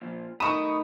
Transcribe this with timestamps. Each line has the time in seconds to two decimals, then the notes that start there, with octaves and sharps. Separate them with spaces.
0.02 A#2 F3
0.40 A3 D#4 A#4 B5 C#6 D#6 E7